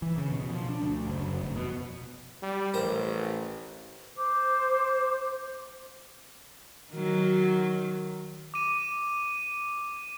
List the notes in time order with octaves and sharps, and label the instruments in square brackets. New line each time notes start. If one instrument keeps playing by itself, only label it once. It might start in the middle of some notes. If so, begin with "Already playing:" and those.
[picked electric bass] E3
C#3
B2
F3
D4
D2
F#1
F1
B2
[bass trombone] G3
[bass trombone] A1 [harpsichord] A#4 C5
[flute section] C5 D6
[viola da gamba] D#3 F#3
[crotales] D6 D#7